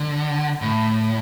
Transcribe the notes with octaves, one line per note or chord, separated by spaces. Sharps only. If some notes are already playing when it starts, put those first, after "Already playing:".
Already playing: D3
A2